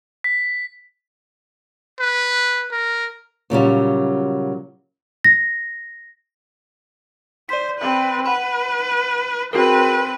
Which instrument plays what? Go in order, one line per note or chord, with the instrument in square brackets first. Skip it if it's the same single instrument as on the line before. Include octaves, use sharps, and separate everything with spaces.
[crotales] B6
[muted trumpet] B4
A#4
[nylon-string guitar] A#2 C#3 F#3 G3
[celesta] A#6
[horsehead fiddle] C5 [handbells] D5 B6
[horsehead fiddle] C4 B4
[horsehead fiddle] B4 [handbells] F#5 B5
[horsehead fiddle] C4 B4 [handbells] F#4 G#4 A#4